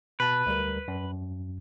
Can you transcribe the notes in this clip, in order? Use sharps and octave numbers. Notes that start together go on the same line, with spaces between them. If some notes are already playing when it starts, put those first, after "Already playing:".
B2 B4 A5
D2 G3 A#4
F#2